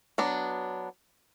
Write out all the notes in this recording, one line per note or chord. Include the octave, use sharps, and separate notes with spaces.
F#3 B3 D4